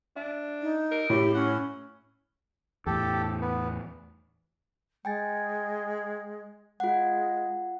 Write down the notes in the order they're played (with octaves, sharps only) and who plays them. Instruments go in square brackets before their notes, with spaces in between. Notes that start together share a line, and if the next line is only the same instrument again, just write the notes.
[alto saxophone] D4 [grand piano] E5
[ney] D#4
[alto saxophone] A#4
[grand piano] A2 [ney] G4
[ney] C#4 [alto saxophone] F#5
[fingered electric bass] E2 A2 [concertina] G4 A4
[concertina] B3
[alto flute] G#3 [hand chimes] G5 G#5 A6
[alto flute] G#3 [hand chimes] F4 F#5